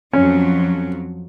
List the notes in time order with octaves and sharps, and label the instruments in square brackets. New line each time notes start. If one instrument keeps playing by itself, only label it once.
[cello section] F2 F#3 [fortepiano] C#4